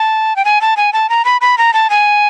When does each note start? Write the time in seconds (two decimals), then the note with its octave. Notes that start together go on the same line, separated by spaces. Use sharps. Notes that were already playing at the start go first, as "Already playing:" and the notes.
Already playing: A5
0.36 G5
0.45 G#5
0.61 A5
0.77 G#5
0.93 A5
1.10 A#5
1.25 B5
1.41 B5
1.58 A#5
1.73 A5
1.90 G#5